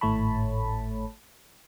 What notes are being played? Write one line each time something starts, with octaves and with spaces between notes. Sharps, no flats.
G#1 A2 A3 C#5 A5 B5